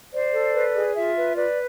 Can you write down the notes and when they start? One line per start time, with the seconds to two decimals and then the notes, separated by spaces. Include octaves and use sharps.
0.14 C5 D5
0.33 A4
0.54 B4
0.75 G#4
0.95 F4 E5
1.16 B4
1.37 B4 D5